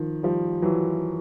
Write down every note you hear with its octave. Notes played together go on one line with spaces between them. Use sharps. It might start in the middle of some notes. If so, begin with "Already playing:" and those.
Already playing: D#3 F3
F3 G3
E3 F#3